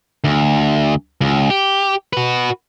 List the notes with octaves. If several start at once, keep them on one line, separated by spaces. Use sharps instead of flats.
D2
C#2
G4
F#4 B4